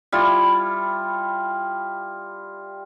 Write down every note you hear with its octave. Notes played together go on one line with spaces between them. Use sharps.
G3 E4 F4